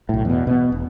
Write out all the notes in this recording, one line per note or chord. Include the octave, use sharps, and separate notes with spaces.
B1 A2
E2 B2
B2 B3
E1